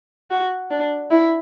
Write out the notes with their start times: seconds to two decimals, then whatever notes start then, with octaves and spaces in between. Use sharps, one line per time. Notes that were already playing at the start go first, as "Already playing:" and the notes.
0.30 F#4
0.71 D4
1.11 E4